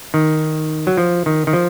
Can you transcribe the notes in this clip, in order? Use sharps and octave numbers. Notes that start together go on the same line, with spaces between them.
D#3
F#3
F3
D#3
D#3
F3